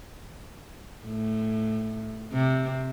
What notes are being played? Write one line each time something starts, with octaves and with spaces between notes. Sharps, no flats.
A2
C3